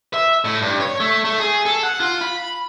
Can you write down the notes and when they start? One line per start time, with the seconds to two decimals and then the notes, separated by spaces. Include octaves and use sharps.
0.14 E5
0.45 A2
0.62 G2
0.80 C#5
1.00 A3
1.24 A3
1.39 G#4
1.65 A4
1.83 F#5
2.00 F4
2.21 B5